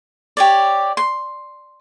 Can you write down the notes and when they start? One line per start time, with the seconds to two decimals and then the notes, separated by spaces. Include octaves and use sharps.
0.37 G4 C#5 D5
0.97 C6